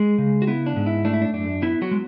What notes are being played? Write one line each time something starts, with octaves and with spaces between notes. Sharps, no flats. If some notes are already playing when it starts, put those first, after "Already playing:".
Already playing: G#3 G#4
C#3
F#4
B3 E4
D4
G#2
E4
A3 D4
E4
D4
F#2 D4
B3 E4
F#3 F#4
G#3